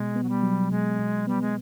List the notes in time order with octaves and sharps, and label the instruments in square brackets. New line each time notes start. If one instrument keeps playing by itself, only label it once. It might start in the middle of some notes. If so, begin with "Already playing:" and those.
Already playing: [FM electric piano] B2 [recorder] G#3
[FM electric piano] B3
[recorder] F#3
G3
[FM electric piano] F#3
[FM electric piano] B2 [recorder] G#3
[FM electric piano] B2
[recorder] G3 [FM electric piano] B3
[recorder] G#3